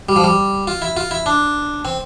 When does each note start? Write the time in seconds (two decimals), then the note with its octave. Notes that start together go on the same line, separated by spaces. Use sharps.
0.09 G3
0.16 F3
0.24 G3
0.67 F4
0.82 E4
0.97 F4
1.11 E4
1.26 D4
1.85 C4